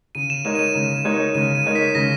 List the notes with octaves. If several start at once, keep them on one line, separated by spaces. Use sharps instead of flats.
C#3 D#7
E7
G#3 D#4 A#4 C#5 E7
D#7
E7
C#3
G#3 D#4 A#4 C#5
C#3 D#7
D#7
G#3 D#4 A#4 C#5
B6
C#3 A#6